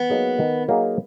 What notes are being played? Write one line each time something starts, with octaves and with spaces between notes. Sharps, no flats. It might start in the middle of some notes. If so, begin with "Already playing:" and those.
Already playing: B3
F#3 A#3 D#4 G#4
D#3
F#3 A#3 D#4 G#4